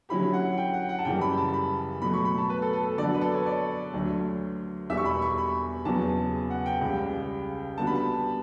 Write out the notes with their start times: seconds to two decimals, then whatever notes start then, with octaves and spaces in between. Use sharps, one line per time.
0.09 D3 F#3 C#4 E4 G4 B5
0.33 F#5
0.58 G5
0.73 F#5
0.89 F#5
0.99 A5
1.05 F#2 C#3 E3 G3 G5
1.21 B5
1.37 A5
1.53 B5
2.02 B2 F#3 A3 B5
2.13 C#6
2.25 B5
2.38 A5
2.50 B4
2.62 A4
2.73 A4
2.85 A4
2.98 D3 F#3 B3 F#4 D5
3.14 B4
3.21 A4
3.34 C#5
3.46 D5
3.93 D2 D3 F#3
4.90 E2 B2 G3 E5
4.97 C#6
5.05 B5
5.22 C#6
5.38 B5
5.85 E2 C#3 F#3 B3 A5
6.50 F#5
6.66 G5
6.81 C#2 C#3 G3
7.78 D3 G3 B3 F#4 A5
7.87 B5
7.95 A5